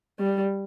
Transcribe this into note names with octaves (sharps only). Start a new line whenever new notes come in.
G3